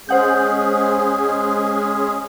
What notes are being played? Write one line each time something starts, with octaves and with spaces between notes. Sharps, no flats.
G#3 C#4 G#4 C5 F#5 G6